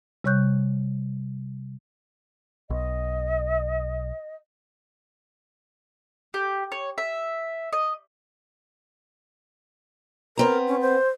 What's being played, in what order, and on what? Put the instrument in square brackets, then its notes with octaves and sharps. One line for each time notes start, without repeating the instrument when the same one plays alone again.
[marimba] C3 G3 C#5 C#6 F#6 G6
[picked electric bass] B1 [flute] D#5
[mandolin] G4
C#5
E5
D#5
[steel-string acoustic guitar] B3 C4 A#5 [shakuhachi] A#4
[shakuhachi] C#4
C5